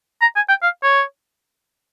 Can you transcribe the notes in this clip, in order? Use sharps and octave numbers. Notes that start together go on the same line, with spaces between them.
A#5
G#5
G5
F5
C#5